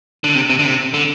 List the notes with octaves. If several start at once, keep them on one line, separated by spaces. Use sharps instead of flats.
D3
C3
C3
D3
C3
D3